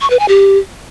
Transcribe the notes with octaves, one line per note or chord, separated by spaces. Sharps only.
C#6
B4
G#5
G4